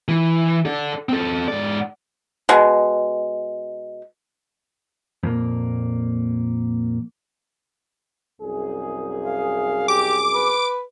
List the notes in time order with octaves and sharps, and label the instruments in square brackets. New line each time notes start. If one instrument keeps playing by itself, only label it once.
[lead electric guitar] E3
A4 D5
C4 A4
G#2 D5
[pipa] B2 G#3
[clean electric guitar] F2 A#2 A#3
[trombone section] C2 F#2 G#4
[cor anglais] F5
[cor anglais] G4 [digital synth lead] D6
[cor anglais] B4